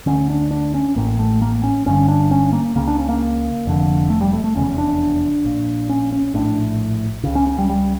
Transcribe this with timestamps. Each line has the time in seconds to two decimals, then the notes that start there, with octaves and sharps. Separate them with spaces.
0.06 D2 D3 C#4
0.30 D4
0.51 D4
0.74 C#4
0.96 A1 A2 A#3
1.19 A3
1.42 A#3
1.63 C#4
1.86 G1 G2 D3 C#4
2.08 D4
2.31 C#4
2.53 A#3
2.76 C#2 C#3 A#3
2.87 D4
2.99 C#4
3.09 A#3
3.65 F1 F2 D3
4.10 A3
4.21 G3
4.33 A3
4.44 A3
4.55 F1 E2 C#3 C#4
4.78 D4
5.44 A#1 A#2
5.89 C#4
6.12 C#4
6.34 A#1 A2 D4
7.24 C#2 C#3
7.35 C#4
7.47 C#4
7.58 G3
7.69 G3